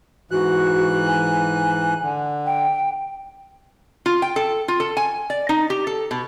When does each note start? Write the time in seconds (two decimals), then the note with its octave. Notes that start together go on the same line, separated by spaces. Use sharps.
0.31 G#2 E3 F#4 F#6
1.07 G#5
2.02 D3
2.46 G5
4.06 F4
4.22 G5
4.36 A4
4.68 F4
4.80 A4
4.97 G#5
5.30 D5
5.49 D#4
5.70 G4
5.87 A4
6.11 B2